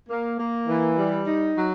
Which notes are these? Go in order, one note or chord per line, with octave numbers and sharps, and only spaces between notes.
A#3
A#3
E3
G3
D#4
F#3